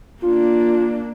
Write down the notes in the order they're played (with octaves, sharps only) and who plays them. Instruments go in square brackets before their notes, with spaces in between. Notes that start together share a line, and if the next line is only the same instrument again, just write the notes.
[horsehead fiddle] A#3 D4 [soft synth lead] F4